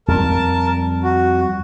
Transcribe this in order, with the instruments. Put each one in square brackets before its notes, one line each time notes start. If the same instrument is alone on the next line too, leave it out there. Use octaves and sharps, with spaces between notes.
[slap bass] F2 G3 [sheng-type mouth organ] A#4 A5
[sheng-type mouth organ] F#4